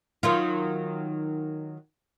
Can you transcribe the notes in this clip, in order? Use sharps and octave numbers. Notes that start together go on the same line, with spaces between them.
D#3 F#3 F4